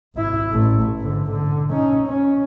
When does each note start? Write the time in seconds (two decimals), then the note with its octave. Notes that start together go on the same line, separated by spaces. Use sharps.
0.15 G#1 E4
0.52 A1 A3
0.99 G#2 D3
1.31 D3
1.70 C#4 D#4
2.07 C#4